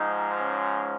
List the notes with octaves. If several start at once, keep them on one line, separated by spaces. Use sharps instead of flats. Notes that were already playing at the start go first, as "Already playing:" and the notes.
Already playing: G#2 F3 D#4
C#4